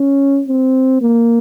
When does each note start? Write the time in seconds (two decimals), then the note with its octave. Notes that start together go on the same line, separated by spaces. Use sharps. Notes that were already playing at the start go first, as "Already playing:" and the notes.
Already playing: C#4
0.48 C4
1.02 A#3